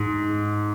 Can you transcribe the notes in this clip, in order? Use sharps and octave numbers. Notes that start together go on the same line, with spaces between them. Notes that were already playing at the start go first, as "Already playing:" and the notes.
Already playing: G#2